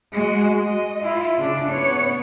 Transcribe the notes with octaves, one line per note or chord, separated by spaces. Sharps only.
G#3 F#4
D#5
E4 F4
C#3 D4
B3 C#5